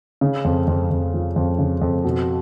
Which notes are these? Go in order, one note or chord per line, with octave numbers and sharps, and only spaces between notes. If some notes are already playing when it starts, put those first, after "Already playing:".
C#3
F2
F2
F2
F3
F2
C#3
F2
B2